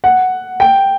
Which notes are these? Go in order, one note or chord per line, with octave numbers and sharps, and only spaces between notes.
F#5
G5